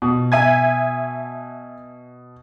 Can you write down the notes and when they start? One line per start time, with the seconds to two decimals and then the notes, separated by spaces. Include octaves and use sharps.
0.02 B2
0.32 E5 G#5 G#6